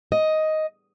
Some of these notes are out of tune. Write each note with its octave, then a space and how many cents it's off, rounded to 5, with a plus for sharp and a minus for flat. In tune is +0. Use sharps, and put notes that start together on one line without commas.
D#5 +5